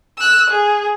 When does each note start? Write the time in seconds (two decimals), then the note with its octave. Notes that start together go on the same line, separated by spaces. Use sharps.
0.18 E6 F#6
0.50 G#4